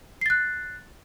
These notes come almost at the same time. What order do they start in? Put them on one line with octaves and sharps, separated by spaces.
C7 A6 F#6